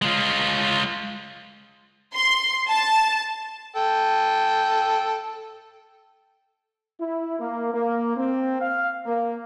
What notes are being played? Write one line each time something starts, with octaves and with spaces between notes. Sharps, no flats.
G#3 F4
C6
A5
A4 G5
E4
A#3
A#3
C4
F5
A#3